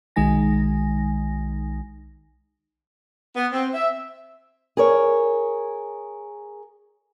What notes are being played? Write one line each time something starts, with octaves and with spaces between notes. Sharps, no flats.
B1 D#3 G#3 D#4 G#5 A#6
B3
C4
E5
G#4 A#4 C#5